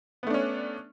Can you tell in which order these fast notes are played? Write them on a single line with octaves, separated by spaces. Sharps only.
B3 A3 D4 C#4